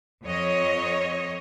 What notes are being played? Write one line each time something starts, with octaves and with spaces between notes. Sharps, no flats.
F2 C#5 D#5